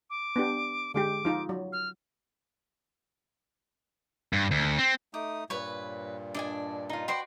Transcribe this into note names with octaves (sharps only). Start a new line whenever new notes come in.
D6
B3 D4 G4
D3 G#3 G4 D6
F3 D#4 F4
F#3
F6
G2
D2
C4
A3 D#4 D6 D#6
G2 A#2 B4 C#5
D4 D5 D#5 G#5
D#4 F4
F#4 B4 C5 D5 G5 C6